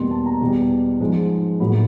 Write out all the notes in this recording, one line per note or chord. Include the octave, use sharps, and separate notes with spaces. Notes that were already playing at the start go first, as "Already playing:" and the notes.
Already playing: E2 B2 G3 A#3 C6
A5
A#5
E2 B2 G3
G#2 F3 G#3
A2 F#3 A#3 B5